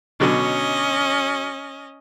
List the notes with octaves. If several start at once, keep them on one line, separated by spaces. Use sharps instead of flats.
B2 D3 F#3 C#4 D#5